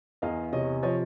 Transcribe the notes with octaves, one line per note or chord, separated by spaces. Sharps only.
E2 D#5 F5
C3 C#5 D#5
F3 C#5 D#5